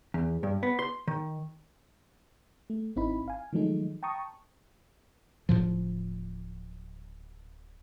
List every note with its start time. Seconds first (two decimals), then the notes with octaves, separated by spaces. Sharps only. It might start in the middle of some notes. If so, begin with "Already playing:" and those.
0.14 E2
0.43 G2
0.63 B3
0.79 C6
1.08 D#3
2.70 A3
2.96 G#1 C4 D#4 E4 B5
3.28 F5 G#5
3.53 D#3 F3 F#3 G#3 A3 D#4
4.03 G5 A5 A#5 C#6 D#6
5.49 D1 C#2 A2 F3